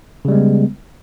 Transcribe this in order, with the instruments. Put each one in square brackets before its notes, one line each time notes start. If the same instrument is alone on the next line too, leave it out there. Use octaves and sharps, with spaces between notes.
[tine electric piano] C#3
G3
G#3
B3